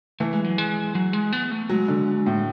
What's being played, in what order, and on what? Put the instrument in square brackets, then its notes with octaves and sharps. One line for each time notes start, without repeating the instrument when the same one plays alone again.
[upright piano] E3 [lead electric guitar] A3
[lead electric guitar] G#3
F#3
G#3
F#3
G#3
B3
A3
[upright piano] F#3 [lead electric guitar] G#3
[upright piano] D3
A2